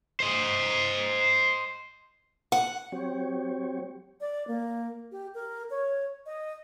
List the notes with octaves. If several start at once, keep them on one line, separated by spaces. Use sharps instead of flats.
C5 D#5
F#5
F#3 C4 G4 C#5
D5
A#3
G4
A#4
C#5
D#5